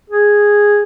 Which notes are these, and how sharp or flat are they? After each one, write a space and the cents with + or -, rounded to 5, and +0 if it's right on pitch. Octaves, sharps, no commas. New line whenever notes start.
G#4 -5